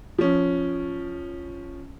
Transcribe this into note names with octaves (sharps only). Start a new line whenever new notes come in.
F3 C#4